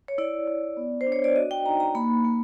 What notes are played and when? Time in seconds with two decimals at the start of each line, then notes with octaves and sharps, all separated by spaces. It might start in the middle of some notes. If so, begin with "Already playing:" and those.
0.08 C#5
0.18 E4 D5
0.47 E4
0.77 B3
1.01 C5
1.07 D4
1.12 C#5
1.24 D5
1.36 F#4 D#5
1.51 G5
1.65 D#4 A#5
1.80 A#5
1.95 A#3 B5
2.24 A#3